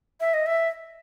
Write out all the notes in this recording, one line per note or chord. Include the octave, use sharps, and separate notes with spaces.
E5
D#5
E5